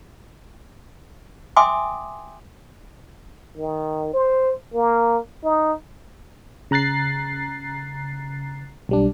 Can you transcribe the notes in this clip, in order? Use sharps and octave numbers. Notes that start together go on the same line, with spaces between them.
E5 G5 G#5 C6 D6 D#6
D#3
C5
A#3
D#4
C#3 A#5 F#6 A6 C7
B1 G3 D4